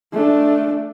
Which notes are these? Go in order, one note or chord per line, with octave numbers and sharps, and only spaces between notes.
A3 D4